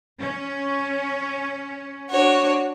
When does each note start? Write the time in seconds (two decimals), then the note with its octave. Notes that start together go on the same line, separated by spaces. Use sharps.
0.19 C#4
2.09 D4 F#4 C#5